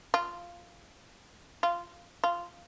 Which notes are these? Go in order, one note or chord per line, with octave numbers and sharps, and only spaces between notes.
F4
F4
F4